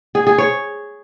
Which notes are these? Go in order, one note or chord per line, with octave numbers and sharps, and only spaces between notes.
G#4
G#4
C#5